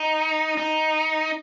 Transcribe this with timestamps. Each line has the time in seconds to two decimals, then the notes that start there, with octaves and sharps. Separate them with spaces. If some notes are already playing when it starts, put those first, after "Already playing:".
Already playing: D#4
0.57 D#4